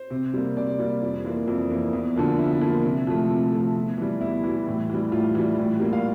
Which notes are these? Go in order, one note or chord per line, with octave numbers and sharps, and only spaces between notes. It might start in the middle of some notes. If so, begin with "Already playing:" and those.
Already playing: C5
C3
G3 A#3
C3 D5
G3 A#3
F2
E3 A#3
F2
E3 A#3
E2
D3 F3 A#3
E2 E4
D3 F3 A#3
C3
F3 A3
C3
F3 A3
E2
E3 G3
E2 E4
E3 G3
A2
E3 G3
A2 F4
E3 G3
A2
G3 A#3
F5